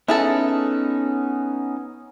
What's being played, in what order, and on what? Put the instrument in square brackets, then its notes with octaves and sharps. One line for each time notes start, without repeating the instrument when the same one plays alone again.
[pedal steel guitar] B3 C#4 D#4 [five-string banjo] E4 G#4 A4